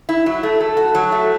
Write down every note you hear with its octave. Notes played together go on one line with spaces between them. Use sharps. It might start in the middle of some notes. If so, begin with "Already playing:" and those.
E4
F#3
A3
A4
F#4
F#3
A3